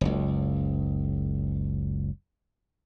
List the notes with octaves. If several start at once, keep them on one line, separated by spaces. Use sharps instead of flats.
F#1 C#2